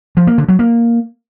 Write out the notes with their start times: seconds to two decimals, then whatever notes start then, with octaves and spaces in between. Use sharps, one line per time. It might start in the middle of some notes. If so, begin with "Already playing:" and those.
0.17 F3
0.27 A#3
0.38 D3
0.49 F#3
0.59 A#3